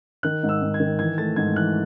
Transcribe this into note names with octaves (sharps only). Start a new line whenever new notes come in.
D#3 F#6
G#2
E6
G#2
G#6
D#3
E3 G#6
A3 A6
G#2 G#6
E3 F#6